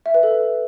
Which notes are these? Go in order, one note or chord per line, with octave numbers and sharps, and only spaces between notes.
E5
B4
A4